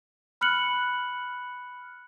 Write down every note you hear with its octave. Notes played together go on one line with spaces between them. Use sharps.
B5 F6 F#6 C#7 F#7